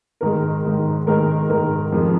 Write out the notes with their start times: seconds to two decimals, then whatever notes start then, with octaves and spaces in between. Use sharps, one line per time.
0.21 G#2 D#3 G#3 A#4
0.65 G#2 D#3 G#3
1.07 G#2 D#3 G#3 A#4
1.49 G#2 D#3 G#3 A#4
1.92 F2 F3 G#3